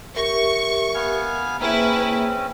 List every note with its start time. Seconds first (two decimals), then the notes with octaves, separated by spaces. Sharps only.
0.16 G4 A#4 E5 C#6
0.94 B3 F5 G#5
1.60 A#3 C4 C#4 E4 G#4 B4